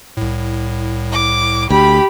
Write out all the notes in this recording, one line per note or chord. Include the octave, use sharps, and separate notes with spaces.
C2 A2
D6
D2 G4 B5